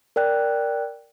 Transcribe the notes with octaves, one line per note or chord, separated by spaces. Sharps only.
A#4 D5 G5 F#6